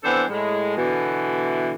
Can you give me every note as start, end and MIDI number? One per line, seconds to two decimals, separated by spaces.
0.04 0.24 52
0.04 0.24 59
0.04 0.24 60
0.04 0.24 62
0.04 0.24 69
0.04 0.24 72
0.29 0.77 45
0.29 0.77 56
0.77 1.74 47
0.77 1.74 50
0.77 1.74 52